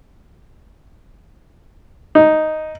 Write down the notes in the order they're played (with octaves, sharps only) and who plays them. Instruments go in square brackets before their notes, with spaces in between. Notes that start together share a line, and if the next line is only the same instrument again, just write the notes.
[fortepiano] D#4